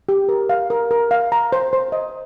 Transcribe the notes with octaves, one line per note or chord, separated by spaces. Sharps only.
G4
A#4
F5
A#4
A#4
F5
A#5
C5
C5
D#5